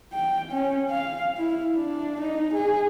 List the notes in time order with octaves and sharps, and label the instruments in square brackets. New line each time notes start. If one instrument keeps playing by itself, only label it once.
[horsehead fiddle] G5
C#4
F5
E4
D4
D#4
G#4